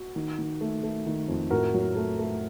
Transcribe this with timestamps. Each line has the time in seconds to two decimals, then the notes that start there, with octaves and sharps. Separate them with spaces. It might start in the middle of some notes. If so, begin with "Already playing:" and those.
Already playing: F#4
0.16 D#3
0.38 D#3
0.61 A3
0.83 A3
1.06 D#3
1.28 F2
1.50 A2 F#4 A#4
1.74 F#3
1.96 A3
2.19 A3